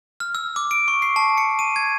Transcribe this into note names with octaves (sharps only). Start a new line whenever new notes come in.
F6
E6
D6
D7
C#6
C7
A5
C#7
D#7
G#6